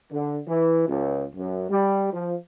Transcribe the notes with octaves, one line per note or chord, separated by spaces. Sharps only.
D3
E3
C#2
F#2
G3
F3